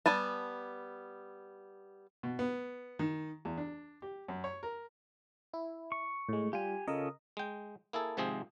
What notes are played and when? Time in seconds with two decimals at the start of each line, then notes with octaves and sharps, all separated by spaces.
0.06 G3 B3 G#5 A5
2.23 B2
2.39 B3
2.99 D#3
3.45 E2
3.58 D4
4.02 G4
4.28 F#2
4.44 C#5
4.63 A#4
5.54 E4
5.92 C#6
6.29 A2 G#3
6.53 G3 F4 G4 G#5
6.88 C#3 C#4 F4 A4 A#4 D#5
7.37 G#3 G5
7.93 A#3 E4 G#4 A4
8.17 G#1 G#2 C3 F3 C4 G#4